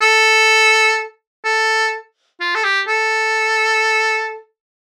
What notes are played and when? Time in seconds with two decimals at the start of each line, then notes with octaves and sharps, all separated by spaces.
0.02 A4
1.45 A4
2.40 F4
2.55 A4
2.64 G4
2.88 A4